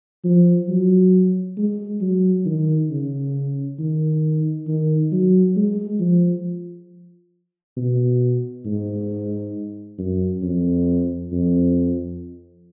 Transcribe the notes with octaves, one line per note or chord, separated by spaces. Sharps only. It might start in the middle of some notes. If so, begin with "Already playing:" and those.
F3
F#3
G#3
F#3
D#3
C#3
D#3
D#3
F#3
G#3
F3
B2
G#2
F#2
F2
F2